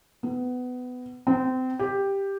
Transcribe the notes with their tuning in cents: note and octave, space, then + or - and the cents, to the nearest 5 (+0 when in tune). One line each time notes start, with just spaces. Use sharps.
B3 +20
C4 -25
G4 +5